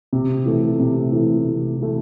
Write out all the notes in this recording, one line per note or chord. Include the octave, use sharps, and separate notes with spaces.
C3
E3 A3
C3
E3 A3
C3
E3 A3